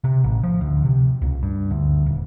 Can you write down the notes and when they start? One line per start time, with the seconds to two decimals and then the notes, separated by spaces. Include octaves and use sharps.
0.04 C3
0.24 A1
0.43 F3
0.61 D2
0.85 C3
1.22 C#2
1.43 G2
1.71 D2
2.06 D#1